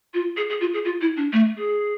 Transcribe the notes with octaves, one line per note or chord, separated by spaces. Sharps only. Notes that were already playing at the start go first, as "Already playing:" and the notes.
F4
G#4
G#4
F4
G#4
F4
E4
D4
A3
G#4